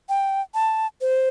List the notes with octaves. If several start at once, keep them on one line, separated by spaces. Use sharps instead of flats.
G5
A5
C5